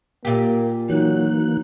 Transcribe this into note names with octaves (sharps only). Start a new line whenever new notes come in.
A#2 A#3 G4
E3 F#3 A#3 D#4 F#6